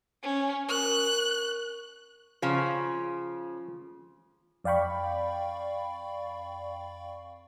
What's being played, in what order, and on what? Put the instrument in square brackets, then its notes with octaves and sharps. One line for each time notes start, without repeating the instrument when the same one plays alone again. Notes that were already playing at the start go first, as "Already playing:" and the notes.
[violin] C#4
[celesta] A#4 C#6 [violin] F#6
[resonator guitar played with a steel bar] C#3 F3 [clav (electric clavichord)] F4
[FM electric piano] F2 D5 F5 G5 B5 C#6